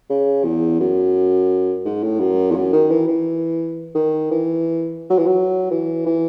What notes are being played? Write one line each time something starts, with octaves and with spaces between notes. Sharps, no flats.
C#3
E2
F#2
G#2
A2
F#2
E2
F#2
D#3
E3
E3
D#3
E3
F#3
E3
F#3
E3
E3